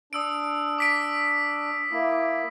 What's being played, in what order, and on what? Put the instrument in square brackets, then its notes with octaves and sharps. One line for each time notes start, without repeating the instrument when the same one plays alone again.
[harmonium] D4 [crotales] D#6 E6 D7
[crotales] D6 B6 D7
[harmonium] A#3 E4